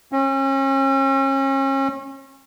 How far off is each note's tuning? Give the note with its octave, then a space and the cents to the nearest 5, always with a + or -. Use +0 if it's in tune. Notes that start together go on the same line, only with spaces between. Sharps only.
C#4 -35